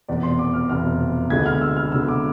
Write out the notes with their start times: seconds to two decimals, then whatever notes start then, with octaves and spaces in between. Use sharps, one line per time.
0.08 F1 E2 B2 D5
0.23 C6
0.39 D6
0.53 F6
0.69 F1 E2 B2 F6
1.30 D2 D3 G#3 B3 G#6
1.46 F6
1.61 E6
1.77 F6
1.92 D2 D3 G#3 B3 E6
2.09 D6